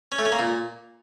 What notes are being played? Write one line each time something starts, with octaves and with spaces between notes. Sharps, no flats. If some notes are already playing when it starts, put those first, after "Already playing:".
C#4
A3
C#4
A#3
A#2